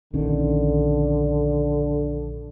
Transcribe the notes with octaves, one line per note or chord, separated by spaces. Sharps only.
A#1 D3 D#3 C#4